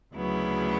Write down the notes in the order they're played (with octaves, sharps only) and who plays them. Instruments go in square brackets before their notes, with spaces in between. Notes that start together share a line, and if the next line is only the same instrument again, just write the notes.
[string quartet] D2 C#3 F#3 B3 E4